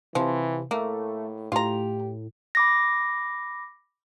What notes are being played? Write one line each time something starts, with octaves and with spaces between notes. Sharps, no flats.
C3 E3 F3
A2 A3 A#3
A2 F4 G4 A#5
B5 D6 A#6